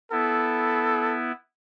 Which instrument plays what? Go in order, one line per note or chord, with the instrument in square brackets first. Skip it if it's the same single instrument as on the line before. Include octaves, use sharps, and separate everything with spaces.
[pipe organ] B3 E4 [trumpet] A4